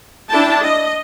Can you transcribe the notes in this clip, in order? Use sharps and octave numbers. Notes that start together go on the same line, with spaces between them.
D4 E4 G5 A5
D#5